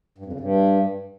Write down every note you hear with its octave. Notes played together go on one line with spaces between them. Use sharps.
G2
F2
C#3
G2